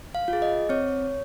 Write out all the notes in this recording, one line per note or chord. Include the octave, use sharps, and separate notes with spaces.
F5
F4
G#4
D#5
C4 C#5